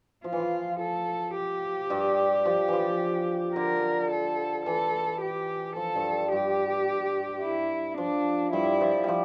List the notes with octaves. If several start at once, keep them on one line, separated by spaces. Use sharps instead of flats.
F3 F4
E3
F3
A4
G4
G2 G3
F3
E3 F3
D3 A#4
A4
E3 A4
G4
F3 A4
G2 G3
G2 G3 G4
E4
F3 D4
G2 G3 E4
F3
F3 G3